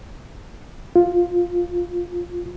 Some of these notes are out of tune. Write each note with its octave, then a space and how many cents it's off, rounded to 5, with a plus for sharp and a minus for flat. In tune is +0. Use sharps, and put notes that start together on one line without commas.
F4 +5